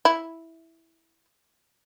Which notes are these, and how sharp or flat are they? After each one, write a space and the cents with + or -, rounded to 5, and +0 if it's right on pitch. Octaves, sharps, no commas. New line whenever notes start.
E4 -5